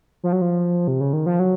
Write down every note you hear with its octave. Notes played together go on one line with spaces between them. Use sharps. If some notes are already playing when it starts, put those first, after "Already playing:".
F3
F#3
F3
C3
C#3
D#3
F3
F#3